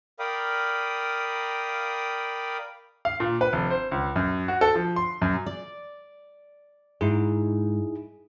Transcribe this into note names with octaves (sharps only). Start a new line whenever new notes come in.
A#4 D5 F5 G5 B5 D#6
F5
A#2
B4
F1
C5
C#2
F#2
F#4
A4
F3
C6
F#2
D5
G#2 D#4 E4 G#4